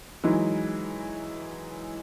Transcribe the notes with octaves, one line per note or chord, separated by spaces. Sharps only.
E3 F#3 G#3 D#4